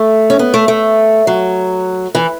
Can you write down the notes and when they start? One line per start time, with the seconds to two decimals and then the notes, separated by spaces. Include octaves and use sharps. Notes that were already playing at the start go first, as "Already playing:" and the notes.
Already playing: A3
0.30 C#4
0.39 B3
0.54 A3
0.68 A3
1.27 F#3
2.15 E3